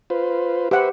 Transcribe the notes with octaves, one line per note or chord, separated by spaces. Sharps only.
F4 B4 C5
G4 B4 C5 E5 F#5